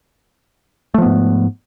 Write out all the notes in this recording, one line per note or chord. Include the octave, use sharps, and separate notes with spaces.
G#2 F3 A3 B3